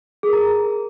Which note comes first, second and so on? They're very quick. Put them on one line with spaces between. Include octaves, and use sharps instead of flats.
G#4 A#4 A#5